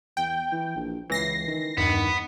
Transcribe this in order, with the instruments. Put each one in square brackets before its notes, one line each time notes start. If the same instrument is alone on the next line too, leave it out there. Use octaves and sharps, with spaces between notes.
[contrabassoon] E2 [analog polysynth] G5
[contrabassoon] E3
A#1
[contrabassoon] C#2 [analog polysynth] E3 A#6 C7
[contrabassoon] D#3
[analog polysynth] E2 G2 [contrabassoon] D#3 [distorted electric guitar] B3